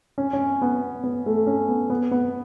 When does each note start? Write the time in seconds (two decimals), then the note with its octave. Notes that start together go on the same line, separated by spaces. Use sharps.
0.18 C#4
0.33 C#4
0.62 B3
1.04 B3
1.26 A3
1.47 C#4
1.69 B3
1.90 B3
2.11 B3